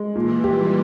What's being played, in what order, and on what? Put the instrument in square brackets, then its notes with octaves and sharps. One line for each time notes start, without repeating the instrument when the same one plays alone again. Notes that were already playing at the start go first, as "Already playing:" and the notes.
Already playing: [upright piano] G#3
[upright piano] A#2 [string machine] E3
[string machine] G3 [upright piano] G4